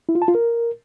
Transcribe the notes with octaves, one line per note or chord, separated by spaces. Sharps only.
E4
F4
A5
F4
A#4